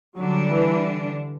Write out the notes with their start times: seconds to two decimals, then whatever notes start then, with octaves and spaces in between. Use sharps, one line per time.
0.17 D3 F#3 G3 D4
0.49 E3